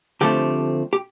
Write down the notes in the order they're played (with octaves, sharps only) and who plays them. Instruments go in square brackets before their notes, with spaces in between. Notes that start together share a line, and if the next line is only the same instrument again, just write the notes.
[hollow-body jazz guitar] D3 F3 A3 C4 G4
G4